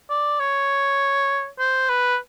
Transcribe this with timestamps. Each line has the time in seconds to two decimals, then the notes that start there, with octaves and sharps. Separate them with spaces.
0.10 D5
0.40 C#5
1.59 C5
1.89 B4